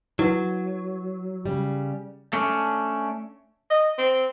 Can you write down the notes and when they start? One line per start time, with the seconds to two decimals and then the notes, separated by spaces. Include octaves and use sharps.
0.19 F#3 E4 B4 F#5
1.46 C#3 G3
2.33 A3 C#4 D4
3.70 D#5
3.98 C4